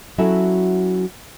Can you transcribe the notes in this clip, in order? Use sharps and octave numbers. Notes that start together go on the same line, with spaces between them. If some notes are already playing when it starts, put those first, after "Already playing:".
F#3 C#4 E4 F#4 A4 E5